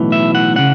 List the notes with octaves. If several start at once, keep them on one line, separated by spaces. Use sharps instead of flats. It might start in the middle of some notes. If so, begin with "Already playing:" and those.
Already playing: B1 A2 E3
E5
F#5
C#3 F#5